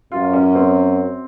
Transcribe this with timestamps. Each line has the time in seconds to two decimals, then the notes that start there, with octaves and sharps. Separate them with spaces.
0.12 F#2 F4
0.33 C#4
0.55 C4